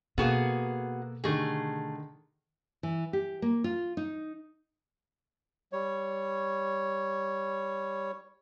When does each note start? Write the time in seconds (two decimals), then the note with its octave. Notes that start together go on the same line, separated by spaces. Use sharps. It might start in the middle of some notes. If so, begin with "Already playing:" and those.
0.18 B2 A#3 B3 F#4 G#4 A4
1.24 D3 D#3 A3 G4 G#4
2.83 E3
3.13 G4
3.42 A#3
3.64 F4
3.97 D#4
5.72 G3 C#5